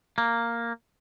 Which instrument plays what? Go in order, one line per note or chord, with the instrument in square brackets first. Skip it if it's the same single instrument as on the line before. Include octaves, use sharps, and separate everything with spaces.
[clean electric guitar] A#3